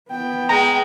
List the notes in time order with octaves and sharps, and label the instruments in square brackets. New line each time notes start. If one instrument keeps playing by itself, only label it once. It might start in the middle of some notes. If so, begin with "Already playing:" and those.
[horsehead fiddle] B3 G5
[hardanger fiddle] G#3 [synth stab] A#5